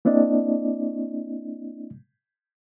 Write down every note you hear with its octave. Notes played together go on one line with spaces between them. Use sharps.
A#3 C4 D4 E4 D5 D#5